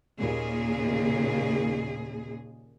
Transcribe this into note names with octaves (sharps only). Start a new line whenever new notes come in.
D#2 A#2 C#3 G#4